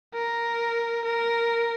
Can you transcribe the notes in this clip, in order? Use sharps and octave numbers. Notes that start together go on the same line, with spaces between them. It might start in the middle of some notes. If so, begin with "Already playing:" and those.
A#4
A#4